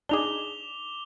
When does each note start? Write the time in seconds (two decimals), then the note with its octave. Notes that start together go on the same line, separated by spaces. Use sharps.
0.09 D4 D#4 G#4 D6 F7 G7